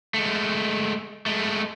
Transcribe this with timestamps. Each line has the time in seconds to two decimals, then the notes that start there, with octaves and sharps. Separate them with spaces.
0.14 G#3 A3
1.26 G#3 A3